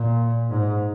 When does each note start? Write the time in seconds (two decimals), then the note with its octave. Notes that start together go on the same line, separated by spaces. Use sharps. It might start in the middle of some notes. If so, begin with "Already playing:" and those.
Already playing: A#2
0.50 G#2